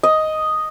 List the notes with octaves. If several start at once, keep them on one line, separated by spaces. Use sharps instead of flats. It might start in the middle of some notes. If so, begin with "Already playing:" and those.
D#5